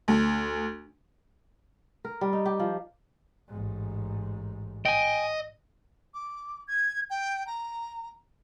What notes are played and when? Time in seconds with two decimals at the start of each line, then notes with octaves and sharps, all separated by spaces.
0.08 D2
2.05 A#4
2.21 G3
2.33 D#4
2.46 G4
2.60 F3
3.48 A1 G#2
4.85 D#5 G5 G#5
6.14 D6
6.68 G#6
7.10 G5
7.47 A#5